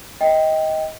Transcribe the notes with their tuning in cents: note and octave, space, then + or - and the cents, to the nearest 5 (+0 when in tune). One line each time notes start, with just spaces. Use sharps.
D#5 +20 G5 +0